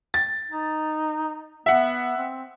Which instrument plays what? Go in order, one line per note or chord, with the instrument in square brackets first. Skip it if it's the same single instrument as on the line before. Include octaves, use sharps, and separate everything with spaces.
[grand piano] A6
[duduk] D#4
[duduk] B3 [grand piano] E5 F#5
[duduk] C4